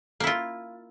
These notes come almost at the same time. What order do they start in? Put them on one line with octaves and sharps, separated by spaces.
A#3 E4 F4